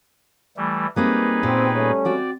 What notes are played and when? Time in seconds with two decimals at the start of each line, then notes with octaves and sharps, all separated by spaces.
0.57 E3 G3 A3
0.96 G3 A#3 C4 D#4 G#4 B4
1.43 A#2 B3 C4 G4
1.73 G3 A3 C#4
2.05 C4 F#4 D5 G5